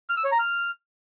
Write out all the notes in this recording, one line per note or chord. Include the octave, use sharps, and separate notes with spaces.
F6
E6
C#5
A#5
F6